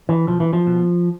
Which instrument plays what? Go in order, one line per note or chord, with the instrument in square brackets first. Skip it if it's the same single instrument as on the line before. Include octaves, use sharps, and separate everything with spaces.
[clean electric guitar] E3
B1 F3
E3
F3
B2